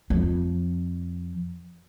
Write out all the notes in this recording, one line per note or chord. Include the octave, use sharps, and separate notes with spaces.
F2 F3